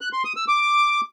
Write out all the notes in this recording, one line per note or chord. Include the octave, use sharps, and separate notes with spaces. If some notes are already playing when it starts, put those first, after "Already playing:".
F#6
C6
D#6
E6
D6